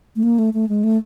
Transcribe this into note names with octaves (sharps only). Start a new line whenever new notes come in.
A3
A#3
A3
A3
G#3
A3